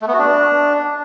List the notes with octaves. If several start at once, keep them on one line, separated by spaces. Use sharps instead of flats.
A3
B3
F#4
D4